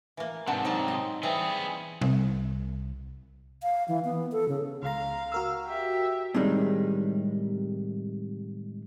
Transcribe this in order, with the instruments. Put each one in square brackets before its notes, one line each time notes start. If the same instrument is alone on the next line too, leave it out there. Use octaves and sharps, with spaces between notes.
[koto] E3 A#3
[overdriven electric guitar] G#2 C3 [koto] D4 [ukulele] F#5 A5
[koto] F#3 C4 A5 [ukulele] D#4 G5
[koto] D#5
[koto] E3 G3 C4 [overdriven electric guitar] B3 G#4
[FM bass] C2
[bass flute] F5
E3
B3
A4
C#3
[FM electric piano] C#2 A#5 [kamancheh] F5
[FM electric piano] F#4 A#4 E6
[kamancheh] G4 E5
[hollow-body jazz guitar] A2 C3 D#3 G3 G#3